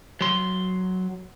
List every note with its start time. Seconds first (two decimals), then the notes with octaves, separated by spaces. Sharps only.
0.21 F#3 C6